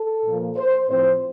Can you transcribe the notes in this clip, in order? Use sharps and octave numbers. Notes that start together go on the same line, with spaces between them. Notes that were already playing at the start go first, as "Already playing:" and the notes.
Already playing: A4
A#2 F3 A#3
C5
A2 F3 C4 C5